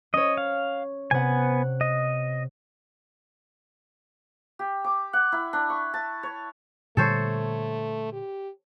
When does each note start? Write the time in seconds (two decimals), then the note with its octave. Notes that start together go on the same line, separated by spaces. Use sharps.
0.14 C#4 C#5 D#5
0.37 F5
1.11 C3 B3 F#5 G#5
1.81 D#5
4.59 G4
4.84 D6
5.13 F#5
5.32 E4
5.53 D4
5.70 C#6
5.94 A5
6.23 C#5
6.97 A#2 D3 G3 A3 A4 C5 C#5
8.13 G4